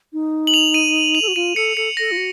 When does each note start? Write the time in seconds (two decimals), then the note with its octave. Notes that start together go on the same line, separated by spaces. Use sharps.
0.13 D#4
0.47 F#7
0.54 F7
0.74 D#7
1.15 F7
1.22 A4
1.28 F#4
1.36 F4 D#7
1.56 A4 C#7
1.77 A4 C#7
1.97 A4 A#6
2.12 F4
2.17 F#4